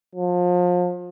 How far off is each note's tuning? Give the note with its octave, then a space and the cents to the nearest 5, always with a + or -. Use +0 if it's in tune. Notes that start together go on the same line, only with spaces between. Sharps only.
F3 +30